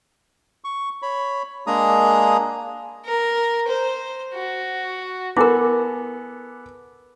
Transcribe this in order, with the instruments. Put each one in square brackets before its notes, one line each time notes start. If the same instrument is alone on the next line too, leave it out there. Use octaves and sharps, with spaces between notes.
[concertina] C#6
C#5 B5
G#3 A#3 D4 G#4 A#5 D#6
[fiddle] A#4
C5
F#4
[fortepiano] B3 A4 [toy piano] E4 A#4 [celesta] G#5 D6